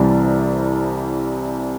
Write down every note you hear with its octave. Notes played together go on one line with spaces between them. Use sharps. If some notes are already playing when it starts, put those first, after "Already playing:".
Already playing: C2 C3 E3 G3